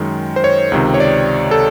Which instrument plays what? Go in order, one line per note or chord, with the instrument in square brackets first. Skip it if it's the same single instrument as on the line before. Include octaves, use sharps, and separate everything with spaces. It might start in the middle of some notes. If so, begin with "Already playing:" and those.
Already playing: [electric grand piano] F#2 D#3 G#3
C5
C#5
C#2 C3 D#3
C#5
D5
A4